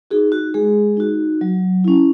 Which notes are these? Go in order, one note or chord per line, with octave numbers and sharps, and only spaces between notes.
D#4 F#4 G#4
F#4
G#3 G#4
D#4 F#4
F#3
C#4 E4